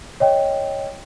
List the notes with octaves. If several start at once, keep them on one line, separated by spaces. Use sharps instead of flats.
C#5 D#5 G5